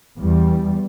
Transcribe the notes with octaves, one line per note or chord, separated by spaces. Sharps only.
E2 G3